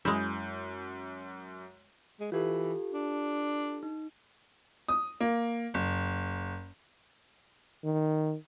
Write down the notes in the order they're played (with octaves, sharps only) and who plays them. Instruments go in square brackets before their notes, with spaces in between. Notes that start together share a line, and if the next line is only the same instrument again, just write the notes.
[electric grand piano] F#2 G6 [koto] G#3 E4
[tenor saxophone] G#3
[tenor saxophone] E3 [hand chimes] F4 G4 A4
[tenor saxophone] D4
[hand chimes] D#4
[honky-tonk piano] D#6
A#3
F#1
[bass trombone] D#3